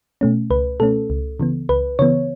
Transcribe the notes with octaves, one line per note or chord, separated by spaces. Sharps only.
B2 A3 C#4
C#2 B4
B2 A3 C#4 A4
C#2
C#3 E3 B3
C#2 B4
C#3 E3 B3 C#5